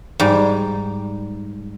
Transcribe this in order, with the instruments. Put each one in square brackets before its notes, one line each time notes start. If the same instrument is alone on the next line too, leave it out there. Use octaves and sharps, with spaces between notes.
[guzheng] G#2 G3